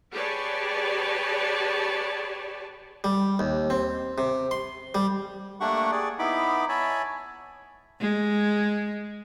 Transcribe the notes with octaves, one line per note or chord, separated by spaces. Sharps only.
G4 G#4 B4 C#5 D5 A5
G3
D#2
C4
C3
C6
G3
A3 A#3 D4 G4 F#5 C#6
G#4 D5
B3 D#4 E4 B5 D6
C#5 E5 G#5 A5 B5
G#3